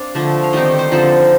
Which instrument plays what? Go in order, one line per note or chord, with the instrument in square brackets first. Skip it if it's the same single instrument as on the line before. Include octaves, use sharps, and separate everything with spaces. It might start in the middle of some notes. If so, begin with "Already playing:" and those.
Already playing: [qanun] C4 D4 F5
D3 F3 A3
F5
D#3 G3 C4 D#4 D#5
D#5
C5
D3 F3 C4 D#4 A4